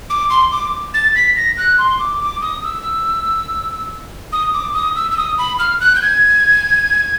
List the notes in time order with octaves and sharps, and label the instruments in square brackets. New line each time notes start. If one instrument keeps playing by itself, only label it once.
[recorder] D6
C6
D6
A6
B6
A#6
F#6
C6
D6
D6
D#6
E6
D#6
D6
D#6
E6
E6
D#6
B5
F6
F#6
G6
G#6